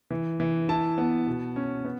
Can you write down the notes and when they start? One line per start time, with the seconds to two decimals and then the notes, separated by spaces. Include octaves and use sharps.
0.10 E3
0.40 E3
0.69 E4 A5
0.98 B3
1.27 B2
1.56 C#4
1.85 B3